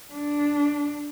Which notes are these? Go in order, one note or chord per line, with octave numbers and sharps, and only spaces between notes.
D4